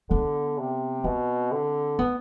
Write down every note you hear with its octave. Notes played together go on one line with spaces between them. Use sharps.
D3 B3
C3
B2 C4
D3
B3